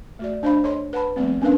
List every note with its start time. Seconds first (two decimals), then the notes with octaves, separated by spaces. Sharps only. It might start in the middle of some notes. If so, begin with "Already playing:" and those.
0.19 A3 F#4 D5
0.43 D4 C5 D#5 F5 B5
0.63 A4 C#5 D#5 C6
0.93 B4 F#5 A5 B5
1.16 F3 G3 A3 B3 C4
1.41 B3 C#4 D4 A#4 B4 F5